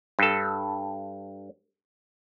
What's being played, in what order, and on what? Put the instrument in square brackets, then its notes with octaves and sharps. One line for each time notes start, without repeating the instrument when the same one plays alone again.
[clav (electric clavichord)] G2 A4